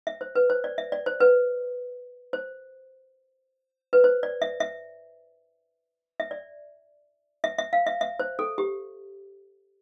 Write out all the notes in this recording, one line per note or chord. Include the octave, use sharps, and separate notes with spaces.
E5
C5
B4
C5
D5
E5
D5
C5
B4
C5
B4
C5
D5
E5
E5
E5
D5
E5
E5
F5
E5
E5
C5
A4
G4